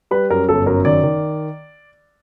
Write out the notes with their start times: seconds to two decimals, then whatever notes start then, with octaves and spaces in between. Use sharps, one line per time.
0.11 G3 B4
0.30 F#2 A#4
0.49 G1 A4
0.66 F#2 A#4
0.85 D#3 D5
1.03 D#3